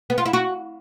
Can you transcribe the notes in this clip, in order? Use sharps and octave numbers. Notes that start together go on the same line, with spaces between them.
B3
F4
E4
F#4